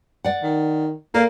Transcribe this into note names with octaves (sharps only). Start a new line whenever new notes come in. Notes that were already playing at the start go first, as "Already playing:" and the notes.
D5 F#5
D#3
A#3 A4 A#4 D5